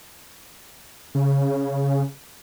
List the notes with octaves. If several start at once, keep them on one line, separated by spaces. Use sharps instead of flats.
C#3